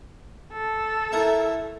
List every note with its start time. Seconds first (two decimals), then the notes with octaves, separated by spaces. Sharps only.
0.53 A4
1.12 A3 E4 A#4